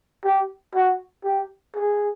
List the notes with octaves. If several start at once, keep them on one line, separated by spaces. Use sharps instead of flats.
G4
F#4
G4
G#4